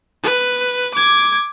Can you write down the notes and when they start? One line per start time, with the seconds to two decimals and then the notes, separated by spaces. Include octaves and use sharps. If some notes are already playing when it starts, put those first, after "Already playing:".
0.23 B4
0.95 D6 G#6